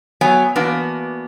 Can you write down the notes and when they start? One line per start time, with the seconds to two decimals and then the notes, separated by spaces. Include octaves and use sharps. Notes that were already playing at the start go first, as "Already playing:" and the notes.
0.21 F#3 B3 C#5 G#5
0.55 E3 A#3 B3 D4 F#4